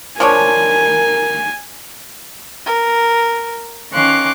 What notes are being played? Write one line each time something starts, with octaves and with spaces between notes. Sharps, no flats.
F3 D4 A#4 C#5 G#5
A#4
D#3 C#4 F5 C6 D6 F#6